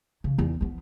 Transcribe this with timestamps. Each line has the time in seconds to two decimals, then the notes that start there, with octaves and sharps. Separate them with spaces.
0.24 C#3
0.38 E2 D#3
0.61 F3 B3